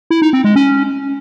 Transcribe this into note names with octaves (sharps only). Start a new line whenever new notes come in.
E4
D#4
C4
G#3
C#4